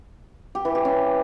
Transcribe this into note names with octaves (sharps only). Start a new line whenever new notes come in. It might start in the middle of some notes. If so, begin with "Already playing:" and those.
G4
E3
G4
C#4